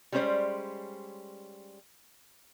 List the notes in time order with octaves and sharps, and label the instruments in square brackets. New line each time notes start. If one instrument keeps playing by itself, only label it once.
[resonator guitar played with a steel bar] G3 G#3 C#4 G#4 C5 D5